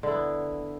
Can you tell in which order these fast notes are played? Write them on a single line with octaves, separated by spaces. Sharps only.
D3 E4 B3